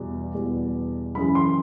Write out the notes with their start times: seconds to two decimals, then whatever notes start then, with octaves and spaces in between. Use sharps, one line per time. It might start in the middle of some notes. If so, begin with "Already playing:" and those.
Already playing: E2 B2 G3
0.35 E2 B2 G3
1.15 F#2 C#3 E3 G#3 B5
1.35 C6